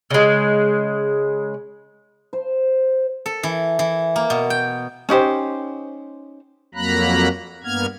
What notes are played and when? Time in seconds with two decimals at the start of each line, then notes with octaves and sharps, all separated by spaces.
0.10 C#3 G#3
2.33 C5
3.26 A4
3.43 E3
3.79 E3
4.16 A#3
4.30 B2
4.50 G5
5.09 C#4 D#4 G4 C5
6.75 F2 F#3 A#3 A#5 B5 F#6
7.64 G2 A#3 B3 F6 G#6